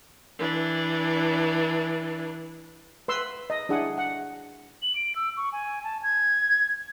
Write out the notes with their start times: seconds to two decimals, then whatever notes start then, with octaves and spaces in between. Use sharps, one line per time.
0.39 E3 D4
3.08 B4 C6 E6
3.50 D#5
3.69 D4 E4 G#4 F#5 D#6
3.98 F#5
4.82 F#7
4.95 D7
5.16 E6
5.37 C#6
5.52 G#5
5.84 A5
6.03 G#6